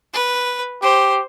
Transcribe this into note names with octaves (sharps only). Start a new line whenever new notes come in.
B4
G4 C5